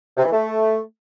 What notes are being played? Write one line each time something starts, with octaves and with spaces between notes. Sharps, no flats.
C3
E3
A3